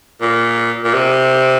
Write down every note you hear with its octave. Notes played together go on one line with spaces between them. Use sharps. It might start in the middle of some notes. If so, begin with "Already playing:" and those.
A#2
A#2
C3